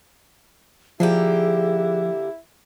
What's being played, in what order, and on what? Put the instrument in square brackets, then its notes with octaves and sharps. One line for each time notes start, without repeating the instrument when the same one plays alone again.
[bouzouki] D3 A#3 G4 [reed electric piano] F3 [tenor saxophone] E4 [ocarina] G#4